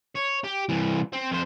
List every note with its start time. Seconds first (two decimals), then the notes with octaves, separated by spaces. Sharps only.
0.16 C#5
0.44 G4
0.69 C2 E3
1.13 C4
1.31 F2 C5